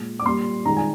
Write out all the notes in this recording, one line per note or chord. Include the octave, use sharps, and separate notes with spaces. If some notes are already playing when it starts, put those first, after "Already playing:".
Already playing: A#2 G#3
D6
A#2 G3 A#3 C6
D#3 G#3 A#5
G#5